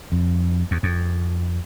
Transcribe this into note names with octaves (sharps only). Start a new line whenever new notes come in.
F2
E2
F2